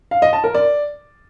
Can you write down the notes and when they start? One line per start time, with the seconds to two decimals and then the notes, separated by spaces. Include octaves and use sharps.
0.11 F5
0.22 D#5
0.33 A5
0.44 A#4
0.55 D5